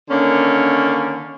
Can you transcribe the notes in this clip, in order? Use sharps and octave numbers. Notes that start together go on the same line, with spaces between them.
D3 D#3 A#3 C#4